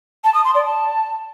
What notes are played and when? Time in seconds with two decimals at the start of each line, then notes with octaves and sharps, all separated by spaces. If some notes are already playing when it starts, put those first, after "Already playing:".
0.24 A5
0.34 D#6
0.45 C6
0.55 D5
0.65 A5